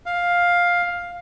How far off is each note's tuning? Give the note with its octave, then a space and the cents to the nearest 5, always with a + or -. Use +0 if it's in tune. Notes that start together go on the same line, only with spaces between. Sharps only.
F5 +10